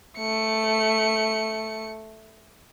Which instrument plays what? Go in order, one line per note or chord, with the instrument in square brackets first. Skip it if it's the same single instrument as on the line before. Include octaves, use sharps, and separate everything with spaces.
[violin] A3 C#7